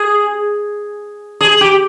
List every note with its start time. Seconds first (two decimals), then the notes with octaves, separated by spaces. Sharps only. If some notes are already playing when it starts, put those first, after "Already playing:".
Already playing: G#4
1.41 G#4
1.61 G4